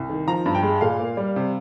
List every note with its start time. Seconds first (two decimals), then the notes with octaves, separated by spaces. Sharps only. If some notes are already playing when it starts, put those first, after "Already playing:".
Already playing: C2
0.09 D#3
0.27 F3 A#5
0.46 G2
0.55 G5
0.63 G#3
0.81 A#2 F5
0.99 A#3
1.17 G3
1.36 C3